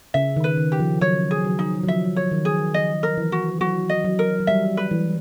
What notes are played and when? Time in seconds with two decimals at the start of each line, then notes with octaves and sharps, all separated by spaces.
0.14 C#3 E5
0.36 D#3
0.44 B4
0.57 D#3
0.72 G4
0.80 F3
1.01 F#3 C#5
1.31 G#4
1.44 F#3
1.59 D#4
1.83 F#3
1.87 F3 E5
2.16 C#5
2.31 D#3
2.45 G#4
2.74 D#3 D#5
3.03 A#4
3.17 E3
3.32 F#4
3.61 F#3 F#4
3.90 D#5
4.05 F#3
4.19 A#4
4.40 F#3
4.47 G3 E5
4.77 B4
4.91 E3